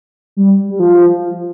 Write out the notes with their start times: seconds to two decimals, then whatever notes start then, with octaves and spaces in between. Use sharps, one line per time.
0.37 G3
0.70 G3
0.80 F3